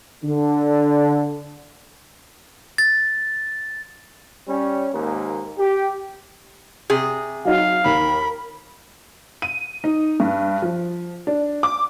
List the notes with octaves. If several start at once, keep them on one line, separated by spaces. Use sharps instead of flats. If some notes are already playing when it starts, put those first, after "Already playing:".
D3
A6
G3 C#4
D#2 G#2 A#3
G4
C3 G#4
F#3 D#4 F#4 F5
D#2 A#4 B5
D#7
D#4
G2
F3
D4
D6